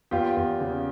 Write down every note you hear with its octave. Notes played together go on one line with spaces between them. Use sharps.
E2 F4 G4
E2
C#3